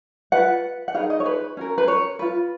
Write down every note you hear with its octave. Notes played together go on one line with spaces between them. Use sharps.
F4 B4 F#5
F#5
D#4 G#4 B4 F5
D#5
C#5
B4
C#4 F#4 A#4
B4
C#5
F4 B4